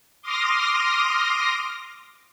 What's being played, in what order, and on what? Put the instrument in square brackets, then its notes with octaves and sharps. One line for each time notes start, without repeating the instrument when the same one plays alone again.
[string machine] C6 D6 D#6 F6 A#6